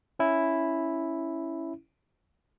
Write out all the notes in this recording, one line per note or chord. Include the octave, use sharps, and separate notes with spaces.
C#4 E4